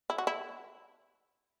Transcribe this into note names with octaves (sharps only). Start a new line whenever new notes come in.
E4
F#4
E4